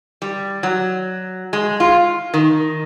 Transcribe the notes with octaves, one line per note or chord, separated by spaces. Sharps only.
G3
F#3
G#3
F4
D#3